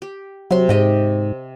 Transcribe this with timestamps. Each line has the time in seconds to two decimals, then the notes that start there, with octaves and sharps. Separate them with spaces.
0.02 G4
0.51 C3 F#3 C6
0.69 G#2 G4 D#5 G5